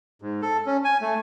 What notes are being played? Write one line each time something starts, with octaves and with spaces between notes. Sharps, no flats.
G#2
A4
C#4
G#5
A3